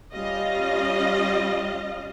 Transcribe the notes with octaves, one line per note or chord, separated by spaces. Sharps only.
G3 C#4 F4 D#5 F5